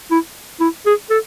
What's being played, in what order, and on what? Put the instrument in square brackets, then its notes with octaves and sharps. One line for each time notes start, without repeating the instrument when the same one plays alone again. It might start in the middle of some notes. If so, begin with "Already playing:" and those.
[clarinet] E4
E4
G#4
A4